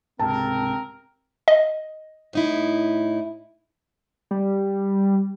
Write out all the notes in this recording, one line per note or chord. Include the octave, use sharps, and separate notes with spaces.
C#2 G#2 C3 C4 A#4 A5
D#5
A2 D#4 E4
G3